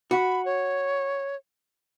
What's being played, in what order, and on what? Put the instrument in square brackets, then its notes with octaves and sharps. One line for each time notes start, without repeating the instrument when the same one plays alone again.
[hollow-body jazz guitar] F#4 [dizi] B5
[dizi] C#5